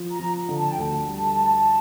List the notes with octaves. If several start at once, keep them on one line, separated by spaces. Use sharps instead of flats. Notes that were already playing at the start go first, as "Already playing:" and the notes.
Already playing: F3
A#5
F3
D3
A5
G5
D2 A5
G3